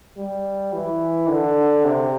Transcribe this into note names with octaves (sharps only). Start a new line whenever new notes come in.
G3
E3
D3
C3